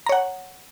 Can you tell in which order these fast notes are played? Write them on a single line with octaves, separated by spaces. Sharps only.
A#5 C#5 F#5